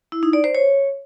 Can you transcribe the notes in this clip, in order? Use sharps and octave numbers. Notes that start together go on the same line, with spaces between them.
E4
D#4
D5
C5
C#5